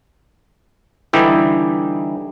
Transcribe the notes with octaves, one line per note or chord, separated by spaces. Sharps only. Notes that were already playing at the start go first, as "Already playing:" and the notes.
D3 E3 G3 D#4 E4 G4